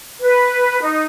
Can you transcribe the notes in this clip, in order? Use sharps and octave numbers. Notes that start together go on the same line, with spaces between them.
B4
D#4